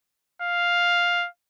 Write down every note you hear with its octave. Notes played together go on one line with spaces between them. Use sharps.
F5